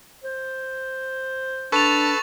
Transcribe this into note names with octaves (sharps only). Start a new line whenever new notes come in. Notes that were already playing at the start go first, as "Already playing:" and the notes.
C5
D4 A4 B4 A5 C#6 A6 F7